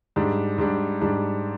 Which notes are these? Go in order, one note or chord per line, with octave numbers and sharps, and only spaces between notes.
G#2 G3 D4
G#2 G3 D4
G#2 G3 D4